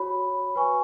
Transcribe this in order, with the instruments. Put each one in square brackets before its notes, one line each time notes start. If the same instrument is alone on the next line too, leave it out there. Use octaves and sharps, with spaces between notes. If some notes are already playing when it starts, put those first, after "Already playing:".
Already playing: [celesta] F#4 C#5 B5
F#4 B4 G#5 C#6